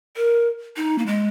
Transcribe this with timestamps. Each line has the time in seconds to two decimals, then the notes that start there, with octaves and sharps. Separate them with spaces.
0.16 A#4
0.77 D#4
0.98 A#3
1.06 G#3